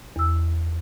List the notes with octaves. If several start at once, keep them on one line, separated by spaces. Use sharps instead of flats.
E2 E6